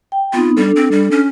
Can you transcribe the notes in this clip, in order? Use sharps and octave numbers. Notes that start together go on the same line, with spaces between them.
G5
B3 C4 D#4 F4
G3 D4 A4
C4
G3
C#4